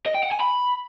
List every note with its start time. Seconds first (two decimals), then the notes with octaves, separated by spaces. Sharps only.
0.06 D#5
0.14 G5
0.23 F#5
0.31 G#5
0.40 B5